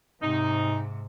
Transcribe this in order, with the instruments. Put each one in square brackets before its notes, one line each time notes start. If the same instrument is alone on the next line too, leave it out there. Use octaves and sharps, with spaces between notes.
[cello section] G#2 C3 [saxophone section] D#4